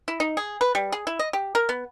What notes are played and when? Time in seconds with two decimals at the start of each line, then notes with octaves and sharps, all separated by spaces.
0.08 E4
0.20 D#4
0.37 G#4
0.61 B4
0.75 G3
0.92 G#4
1.07 E4
1.19 D#5
1.33 G4
1.55 A#4
1.69 B3